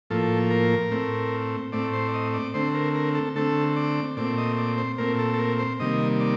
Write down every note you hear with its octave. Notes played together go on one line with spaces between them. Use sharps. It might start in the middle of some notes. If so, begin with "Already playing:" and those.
A2 F3 A#3 A4
A#4
A2 A3 C4
A2 A3 C4 D5
C5
D5
D#5
D5
D3 A3 C4 C5
A#4
A#4
A4
D3 A3 C4 A4
D5
A#2 A3 C4 D5
D#5
D5
C5
A#2 A3 C4 A#4
A4
A4
A#4
C5
C3 D#3 G3 A#3 D#5
D5